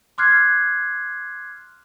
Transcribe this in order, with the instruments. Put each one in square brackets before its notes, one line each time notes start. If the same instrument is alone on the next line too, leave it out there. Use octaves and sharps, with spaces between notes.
[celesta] C6 D6 F6 F#6 G#6 C7